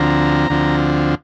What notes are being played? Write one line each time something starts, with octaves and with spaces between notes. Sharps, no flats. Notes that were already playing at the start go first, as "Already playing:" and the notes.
Already playing: D2 D3 F3 C4 A#5
D2 D3 F3 C4